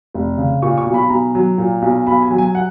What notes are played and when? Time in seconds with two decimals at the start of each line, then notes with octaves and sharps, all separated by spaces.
0.14 F1
0.38 C#3
0.62 A#2 C#6
0.78 C#6
0.86 B1
0.94 B5
1.10 B1 A#5
1.35 F#3
1.58 A#2
1.82 B1
2.07 B1 B5
2.22 G#5
2.31 F#3
2.38 G#5
2.55 F#5